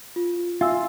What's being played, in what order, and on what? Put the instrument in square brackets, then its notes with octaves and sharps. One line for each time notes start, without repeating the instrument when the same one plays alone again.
[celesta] F4
[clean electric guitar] F4 [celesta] E5 G#5 E6